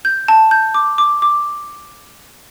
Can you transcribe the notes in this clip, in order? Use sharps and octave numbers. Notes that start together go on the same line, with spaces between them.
G6
A5
G6
D6
D6
D6